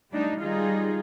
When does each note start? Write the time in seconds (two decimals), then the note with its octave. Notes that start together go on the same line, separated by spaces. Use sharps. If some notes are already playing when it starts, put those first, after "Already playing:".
0.10 G3 A3 D4 D#4
0.42 D#3 G3 D#4 F4 G#4